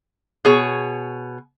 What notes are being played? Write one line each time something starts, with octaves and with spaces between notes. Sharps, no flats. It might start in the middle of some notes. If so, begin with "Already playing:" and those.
B2 G#4 C#5